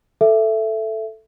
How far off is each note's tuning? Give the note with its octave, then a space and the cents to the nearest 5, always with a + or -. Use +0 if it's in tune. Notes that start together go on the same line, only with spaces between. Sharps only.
A4 +0 E5 +10